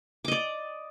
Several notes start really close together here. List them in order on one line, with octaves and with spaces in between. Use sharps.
D6 D#5 D5